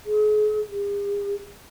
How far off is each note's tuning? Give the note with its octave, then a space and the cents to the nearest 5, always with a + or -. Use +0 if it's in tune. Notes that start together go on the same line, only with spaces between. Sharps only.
G#4 +40
G#4 -45